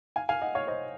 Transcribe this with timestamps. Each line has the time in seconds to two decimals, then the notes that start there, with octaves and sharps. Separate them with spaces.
0.16 F5 G#5
0.29 F5 G#5
0.41 D#5 F#5
0.55 C#5 F5
0.67 C5 D#5